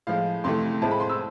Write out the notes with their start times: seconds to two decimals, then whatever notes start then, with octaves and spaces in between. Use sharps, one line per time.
0.07 A2 F3 G#3 F5
0.44 F2 C3 E3 A3 C6
0.82 A2 G#3 C4 E4 A5
0.91 B5
1.00 C6
1.09 E6